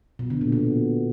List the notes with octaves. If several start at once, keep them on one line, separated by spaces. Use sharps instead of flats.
B2
D3
A#2
B2